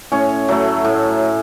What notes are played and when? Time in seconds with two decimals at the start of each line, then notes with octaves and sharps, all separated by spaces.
0.12 A2 C#4 C#5
0.48 F#3 A3
0.85 A2